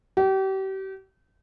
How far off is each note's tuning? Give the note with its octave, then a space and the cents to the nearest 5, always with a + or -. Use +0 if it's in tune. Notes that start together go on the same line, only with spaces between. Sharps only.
G4 -35